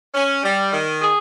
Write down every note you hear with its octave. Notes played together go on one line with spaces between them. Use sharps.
C#4
G3
D#3
G#4